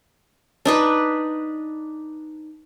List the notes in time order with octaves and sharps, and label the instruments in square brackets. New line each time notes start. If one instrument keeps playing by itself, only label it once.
[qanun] D4 D#4 B4